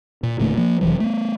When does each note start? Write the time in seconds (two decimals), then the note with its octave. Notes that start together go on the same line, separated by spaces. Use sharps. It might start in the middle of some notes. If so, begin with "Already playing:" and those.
0.23 A#2
0.39 E1 A#2 D3 A3
0.57 F3 A#3
0.81 F1 E2 E3 F#3
1.00 A3 B3